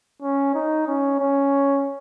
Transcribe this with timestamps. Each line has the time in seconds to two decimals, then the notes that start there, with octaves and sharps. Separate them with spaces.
0.22 C#4
0.54 D#4
0.87 C#4
1.20 C#4